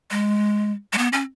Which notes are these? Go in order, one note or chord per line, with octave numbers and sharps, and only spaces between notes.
G#3
G#3
B3
C#4